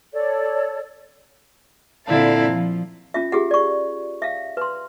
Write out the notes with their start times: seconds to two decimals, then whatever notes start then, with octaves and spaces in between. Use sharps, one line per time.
0.13 A4 C#5 D5
2.07 A#2 D3 C4 E4 F5 A5
2.50 F3
3.14 C#4 F4 E5
3.32 F4 G4 G#4 F#5
3.51 D5 C#6
4.22 E5 F5
4.57 B4 C6